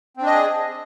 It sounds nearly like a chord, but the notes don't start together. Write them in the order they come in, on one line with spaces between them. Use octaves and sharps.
C4 D4 D#5 G#4